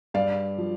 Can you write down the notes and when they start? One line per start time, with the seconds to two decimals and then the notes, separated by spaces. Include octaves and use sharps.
0.14 G2 D5 F5
0.58 F3